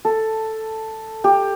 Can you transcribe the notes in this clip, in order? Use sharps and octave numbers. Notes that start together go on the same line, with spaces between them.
A4
G4